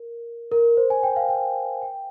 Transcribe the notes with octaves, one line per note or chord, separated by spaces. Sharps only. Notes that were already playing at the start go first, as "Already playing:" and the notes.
Already playing: A#4
A#4
C5
G#5
G5
F5
G5
G5